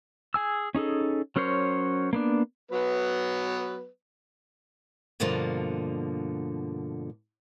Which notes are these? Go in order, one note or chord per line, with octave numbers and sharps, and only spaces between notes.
G#4 G#5 E6
C#4 D#4 G#4 A4
F#3 C#4 A#4 C5 C#5
A#3 B3 D4
F#3 B3 B4
G2 B2 D3 F3 A#3